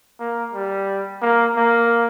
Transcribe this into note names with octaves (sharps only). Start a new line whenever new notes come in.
A#3
G3
A#3
A#3